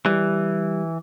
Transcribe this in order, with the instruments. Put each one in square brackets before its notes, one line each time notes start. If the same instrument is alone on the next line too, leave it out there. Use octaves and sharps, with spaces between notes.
[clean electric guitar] E3 [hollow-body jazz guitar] G3